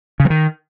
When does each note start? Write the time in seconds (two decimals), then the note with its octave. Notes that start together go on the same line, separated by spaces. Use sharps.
0.20 C#3
0.25 F#3
0.30 D#3